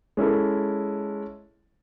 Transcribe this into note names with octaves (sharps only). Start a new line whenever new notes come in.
G#3 C#4 E4 A4